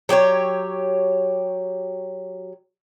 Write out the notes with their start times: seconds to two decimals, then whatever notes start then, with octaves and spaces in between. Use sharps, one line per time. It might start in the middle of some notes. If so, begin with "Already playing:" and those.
0.09 F#3 G4 C5 C#5